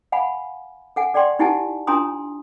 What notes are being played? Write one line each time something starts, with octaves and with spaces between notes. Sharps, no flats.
F5 F#5 G#5 B5
A4 F#5 G#5
A4 D5 F#5 G5 C6 C#6
D#4 E4 G4 F#5 G#5 A5
D4 F4 G#5 A#5 C6 D#6